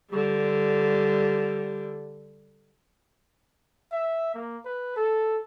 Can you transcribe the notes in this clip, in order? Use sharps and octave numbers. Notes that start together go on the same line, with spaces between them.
D3 G3
E5
A#3
B4
A4